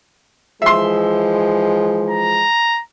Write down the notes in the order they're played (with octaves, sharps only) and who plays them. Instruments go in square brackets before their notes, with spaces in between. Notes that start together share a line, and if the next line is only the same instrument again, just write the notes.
[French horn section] E3 F3 G#3 [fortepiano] E5 C6
[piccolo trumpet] A#5